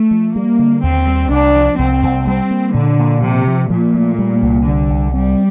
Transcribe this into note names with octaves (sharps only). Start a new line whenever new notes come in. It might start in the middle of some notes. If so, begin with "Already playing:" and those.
Already playing: A3
F3
G3 A#3
D3
D#2 C4
G3
C2 D4
F3
C2 C4
C2
G3 C4
A#3
A#2 D3
A#2
C3 F3
F3
A#2 F3
A3
G3
C2
D3 G3
C2
G3 C4